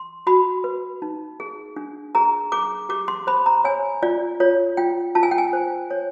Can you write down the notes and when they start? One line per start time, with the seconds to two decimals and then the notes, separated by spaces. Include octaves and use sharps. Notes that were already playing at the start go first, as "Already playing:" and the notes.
Already playing: C6
0.27 F#4 B5
0.64 B4
1.02 D#4
1.40 G#4
1.76 D4
2.15 G#4 A#5
2.52 G#4 D6
2.89 G4 D6
3.08 C6
3.27 C5 B5
3.46 A#5
3.64 C#5 G#5
4.03 F4 D5
4.40 F4 C#5
4.77 F4 G5
5.15 F4 A5
5.23 G#5
5.31 G5
5.38 G#5
5.53 C5
5.91 C#5